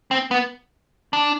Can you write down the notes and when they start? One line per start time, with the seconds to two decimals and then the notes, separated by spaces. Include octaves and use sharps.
0.11 C4
0.31 B3
1.13 D4